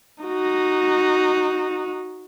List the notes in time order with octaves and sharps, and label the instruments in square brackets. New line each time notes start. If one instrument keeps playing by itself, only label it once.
[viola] D#4 F#4